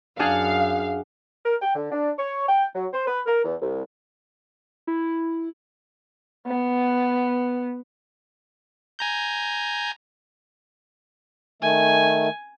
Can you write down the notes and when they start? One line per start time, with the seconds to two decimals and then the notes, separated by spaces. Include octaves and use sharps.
0.19 F#2 D4 G#4 F5 F#5
1.45 A#4
1.61 G5
1.75 D3
1.91 D4
2.18 C#5
2.48 G5
2.75 F#3
2.93 C5
3.07 B4
3.26 A#4
3.44 E2
3.62 C2
4.87 E4
6.46 B3
8.99 G#5 A#5 G6
11.62 D#3 A3 G#5